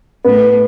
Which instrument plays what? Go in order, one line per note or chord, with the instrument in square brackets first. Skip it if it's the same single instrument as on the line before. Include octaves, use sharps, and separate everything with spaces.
[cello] A2 [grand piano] B3